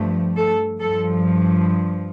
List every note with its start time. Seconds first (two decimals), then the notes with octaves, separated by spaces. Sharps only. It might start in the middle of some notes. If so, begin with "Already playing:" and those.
Already playing: G2 F3 A3
0.37 A4
0.81 G2 F3 A4